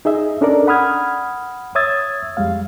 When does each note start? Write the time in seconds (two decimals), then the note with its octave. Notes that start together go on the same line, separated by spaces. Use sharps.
0.05 D#4 G#4 D#5 E5
0.41 C#4 D4 A4 A#4 D5
0.67 F#5 B5 D#6 F6 G#6
1.75 C#5 E5 D#6 E6 G#6 A6
2.37 F2 G3 G#3 F5